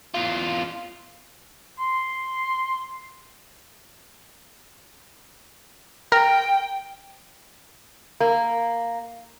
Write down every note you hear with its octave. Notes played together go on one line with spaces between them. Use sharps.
E2 F4
C6
A#4 G5
A#3